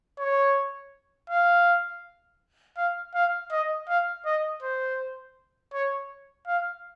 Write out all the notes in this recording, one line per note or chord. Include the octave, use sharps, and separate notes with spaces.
C#5
F5
F5
F5
D#5
F5
D#5
C5
C#5
F5